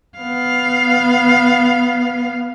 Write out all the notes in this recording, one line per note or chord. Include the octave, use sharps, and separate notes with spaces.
B3 F5